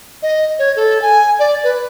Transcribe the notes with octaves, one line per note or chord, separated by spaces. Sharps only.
D#5
C#5
A4
G#5
D5
B4